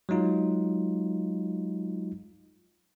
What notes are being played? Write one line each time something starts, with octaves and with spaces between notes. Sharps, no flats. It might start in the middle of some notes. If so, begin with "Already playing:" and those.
F#3 G#3 D#4 F4